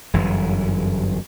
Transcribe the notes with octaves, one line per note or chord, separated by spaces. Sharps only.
G1 F#2 E3